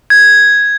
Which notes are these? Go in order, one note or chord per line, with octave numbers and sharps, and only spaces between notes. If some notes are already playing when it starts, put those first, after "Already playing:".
G#6